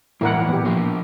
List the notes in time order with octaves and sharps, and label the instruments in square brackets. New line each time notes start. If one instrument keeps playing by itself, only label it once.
[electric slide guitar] A2 E3 A#3 [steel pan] E4 A#4 F#5
[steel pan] B3 G4
[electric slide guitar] F3 A#3